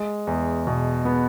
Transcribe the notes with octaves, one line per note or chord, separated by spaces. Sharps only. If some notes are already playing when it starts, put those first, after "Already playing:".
Already playing: G#3
E2
B2
B3